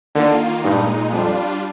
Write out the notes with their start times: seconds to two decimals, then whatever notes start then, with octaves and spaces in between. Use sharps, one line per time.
0.15 D3 D#3 A#3 F4
0.63 G2 A#2 G#3 D#4
1.12 F2 G3 D4 F4